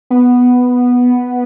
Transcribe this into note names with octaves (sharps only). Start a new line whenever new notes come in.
B3